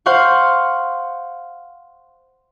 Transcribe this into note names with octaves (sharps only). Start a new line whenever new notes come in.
C5 F5 F#5 C6 C#6